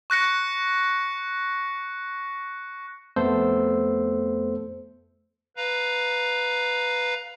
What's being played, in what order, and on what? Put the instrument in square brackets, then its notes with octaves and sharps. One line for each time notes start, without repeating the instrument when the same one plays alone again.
[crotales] C#6 F#6 A#6 C#7
[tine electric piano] F2 A3 B3 A4 C5 E6
[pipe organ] B4 F5 A#5